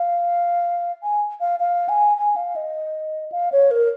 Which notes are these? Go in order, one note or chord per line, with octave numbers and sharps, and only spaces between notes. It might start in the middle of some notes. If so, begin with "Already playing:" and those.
Already playing: F5
G#5
F5
F5
G#5
G#5
F5
D#5
F5
C#5
A#4